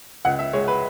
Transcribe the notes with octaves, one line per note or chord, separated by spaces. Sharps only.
C#2 F#5
E5
G#3 C#5
B4